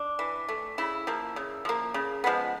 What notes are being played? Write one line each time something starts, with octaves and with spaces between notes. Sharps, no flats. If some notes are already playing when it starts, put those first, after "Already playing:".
Already playing: D4
E3
A3
C#3 E4
F3 A#3
C#3
F3 A#3
C#3
F3 G#3 B3